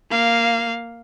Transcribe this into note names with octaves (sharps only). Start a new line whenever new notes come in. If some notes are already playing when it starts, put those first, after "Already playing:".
A#3 F5